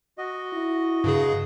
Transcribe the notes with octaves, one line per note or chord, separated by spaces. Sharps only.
F#4 D#5
E4
G2 C#3 G#4